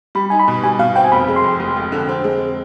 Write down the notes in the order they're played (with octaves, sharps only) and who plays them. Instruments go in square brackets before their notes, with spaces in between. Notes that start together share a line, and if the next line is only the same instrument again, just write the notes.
[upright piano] G3 [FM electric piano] B5
[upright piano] D#4 [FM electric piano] G#5
[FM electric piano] B5
[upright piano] B2
[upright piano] G3 [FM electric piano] G#5
[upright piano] B2 [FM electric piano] F5
[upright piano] C4 [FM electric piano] G5
[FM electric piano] G#5
[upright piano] F1 [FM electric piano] B5
[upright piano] G#3
[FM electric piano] C6
[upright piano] F2
F1
F1
D3
C4
G#3